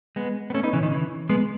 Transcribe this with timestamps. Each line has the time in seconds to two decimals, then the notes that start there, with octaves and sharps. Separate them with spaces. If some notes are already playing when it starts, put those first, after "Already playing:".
0.16 G#3 B3
0.50 B3
0.54 A3 C#4
0.63 B3 D#4
0.73 C#3 E3
0.83 D#3
0.92 C#3 E3
1.29 G#3 B3